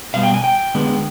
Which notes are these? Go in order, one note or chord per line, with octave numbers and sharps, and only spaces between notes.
B2 G3 B3 F5
G5
G#5
G5
D3 G#3 B3